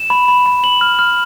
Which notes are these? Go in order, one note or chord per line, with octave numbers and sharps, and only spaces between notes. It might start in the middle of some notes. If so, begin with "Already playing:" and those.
Already playing: E7
B5
B5
B5
B5 F#7
F6
F6